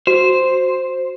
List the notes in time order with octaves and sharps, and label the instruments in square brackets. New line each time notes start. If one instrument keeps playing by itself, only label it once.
[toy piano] F#4 [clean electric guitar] C5